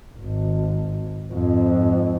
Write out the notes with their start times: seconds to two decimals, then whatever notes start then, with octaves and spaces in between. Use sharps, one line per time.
0.20 G#1
1.33 F2 G#2